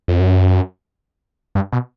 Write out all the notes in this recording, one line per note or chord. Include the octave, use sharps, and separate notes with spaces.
F2
F#2
G2
B2